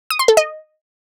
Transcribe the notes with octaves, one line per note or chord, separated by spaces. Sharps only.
D#6
C6
A4
D#5